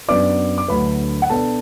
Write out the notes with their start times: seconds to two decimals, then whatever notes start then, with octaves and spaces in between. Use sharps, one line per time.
0.08 F#2 F#3 B3 D4 D5 D6
0.58 D6
0.68 D2 D3 F#3 A3 B4 B5
1.22 F#5
1.29 B2 B3 D4 A4 A5